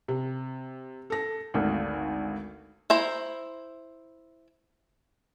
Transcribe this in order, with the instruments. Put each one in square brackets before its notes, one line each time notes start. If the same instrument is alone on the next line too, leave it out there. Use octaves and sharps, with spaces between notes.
[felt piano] C3
A4 A#6
G#1 D2
[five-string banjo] E4 C5 A#5